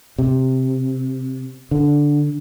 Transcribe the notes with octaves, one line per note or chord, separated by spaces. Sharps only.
C3
D3